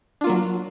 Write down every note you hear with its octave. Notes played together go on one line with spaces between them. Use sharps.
F#3 A#3 D4 F4